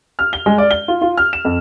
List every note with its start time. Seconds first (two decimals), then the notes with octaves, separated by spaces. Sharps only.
0.19 F6
0.33 G7
0.46 G#3
0.58 D5
0.71 G7
0.88 F4
1.02 F4
1.17 F6
1.33 E7
1.45 F2